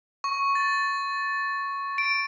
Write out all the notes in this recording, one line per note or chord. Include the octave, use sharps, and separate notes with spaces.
C#6
A6
D7